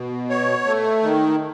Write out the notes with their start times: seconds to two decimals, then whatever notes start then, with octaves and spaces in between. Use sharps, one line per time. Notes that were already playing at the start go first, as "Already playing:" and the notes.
Already playing: B2
0.30 C#5
0.66 A3
1.03 D#3